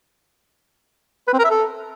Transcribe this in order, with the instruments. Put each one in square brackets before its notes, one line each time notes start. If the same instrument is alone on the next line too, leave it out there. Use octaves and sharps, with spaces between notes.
[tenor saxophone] B4
C4
A#4
E5
A4